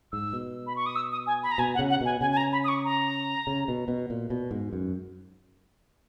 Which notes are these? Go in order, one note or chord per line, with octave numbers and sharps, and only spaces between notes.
G#2 E6
B2
B5
C#6
D#6
E6
D#6
G#5
B5
A#5
B2 G#5
F#5
C#3
F#5
B2 G#5
C#3 G#5
G#5
A#5
B5
D#6
C#6
A#5
C#3
B2
B2
A#2
B2
G#2
F#2